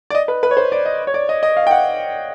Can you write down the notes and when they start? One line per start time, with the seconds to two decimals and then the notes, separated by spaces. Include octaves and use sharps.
0.10 D5
0.15 D#5
0.28 B4
0.43 B4
0.51 C#5
0.57 C5
0.72 D5
0.86 D#5
1.07 C#5
1.14 D5
1.29 D#5
1.43 D#5
1.57 F5
1.67 G5
1.71 F#5